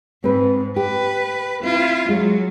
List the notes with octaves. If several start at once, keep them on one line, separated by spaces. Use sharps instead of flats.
G#2 C4 B4
G4 B4
C4 E4 F4
F#3 G#3